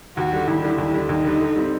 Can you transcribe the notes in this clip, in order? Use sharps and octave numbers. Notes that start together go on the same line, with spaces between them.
D#2 F#4
D3 G3
D#2 E4
D3 G3
D#2
D3 G3
D#2 D#4
D3 G3
D3
G3 C4